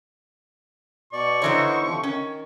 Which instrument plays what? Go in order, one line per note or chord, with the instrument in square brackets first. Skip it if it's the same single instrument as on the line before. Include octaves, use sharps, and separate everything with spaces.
[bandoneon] B2 D5 [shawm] C#6
[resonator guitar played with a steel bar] D3 E3 C#5 [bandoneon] B3 D#4 C5
[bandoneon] C3 F3
[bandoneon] D#3 [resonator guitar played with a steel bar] C#4